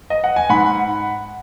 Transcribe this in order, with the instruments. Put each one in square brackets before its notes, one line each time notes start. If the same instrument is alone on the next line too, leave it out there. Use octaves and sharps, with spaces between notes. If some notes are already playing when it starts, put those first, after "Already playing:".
[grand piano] D#5
F#5
G#5
G#2 F#5 B5